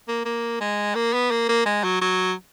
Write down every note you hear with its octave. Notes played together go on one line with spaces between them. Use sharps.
A#3
A#3
G#3
A#3
B3
A#3
A#3
G#3
F#3
F#3